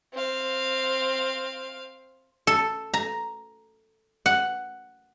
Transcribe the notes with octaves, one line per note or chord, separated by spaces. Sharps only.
C4 F5
A4
A#5
F#5